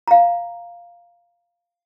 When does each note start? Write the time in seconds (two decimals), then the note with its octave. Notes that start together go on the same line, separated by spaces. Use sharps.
0.08 F5 A#5